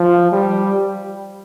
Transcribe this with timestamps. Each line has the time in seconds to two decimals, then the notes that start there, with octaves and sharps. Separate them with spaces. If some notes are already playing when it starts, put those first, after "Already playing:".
Already playing: F3
0.32 G3